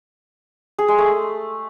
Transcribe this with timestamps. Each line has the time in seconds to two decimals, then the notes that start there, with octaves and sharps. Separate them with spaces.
0.79 G#4
0.88 G#3
0.98 A3